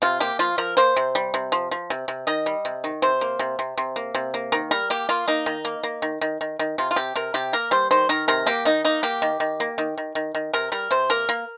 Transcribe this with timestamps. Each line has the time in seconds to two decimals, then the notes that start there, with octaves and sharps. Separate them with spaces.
0.02 C3 F4
0.20 A#3 G4
0.39 F3 F4
0.58 F3 A#4
0.77 A#3 C5
0.97 C3
1.15 G3
1.34 C3
1.52 F3
1.71 F3
1.90 C3
2.08 C3
2.27 D#3 D#5
2.46 G3
2.65 C3
2.84 D#3
3.02 C3 C5
3.21 A#3
3.39 C3
3.59 C3
3.78 C3
3.96 A#3
4.15 C3
4.34 A#3
4.52 D#3 A#4
4.71 G3 A#4
4.90 A#3 G4
5.09 A#3 F4
5.28 A#3 D#4
5.46 D#3
5.65 A#3
5.83 A#3
6.02 D#3
6.21 D#3
6.41 D#3
6.59 D#3
6.78 C3 F4
6.91 F4
6.96 C3 G4
7.16 C3 A#4
7.34 C3 G4
7.53 A#3 A#4
7.71 G3 C5
7.91 D#3 C5
8.09 D#3 A#4
8.28 C3 A#4
8.46 A#3 G4
8.65 D#3 D#4
8.85 A#3 D#4
9.03 A#3 G4
9.22 D#3
9.40 D#3
9.60 A#3
9.78 D#3
9.98 D#3
10.15 D#3
10.35 D#3
10.53 C3 A#4
10.72 G3 A#4
10.91 C3 C5
11.10 A#3 A#4
11.29 A#3